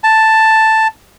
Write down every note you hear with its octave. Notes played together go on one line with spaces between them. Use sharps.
A5